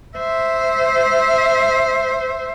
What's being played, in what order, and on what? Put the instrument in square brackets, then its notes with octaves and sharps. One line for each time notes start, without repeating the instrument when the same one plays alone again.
[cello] C5 E5